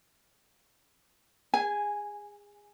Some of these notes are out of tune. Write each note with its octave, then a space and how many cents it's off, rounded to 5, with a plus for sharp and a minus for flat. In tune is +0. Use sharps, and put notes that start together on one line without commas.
G#4 -25 G#5 +0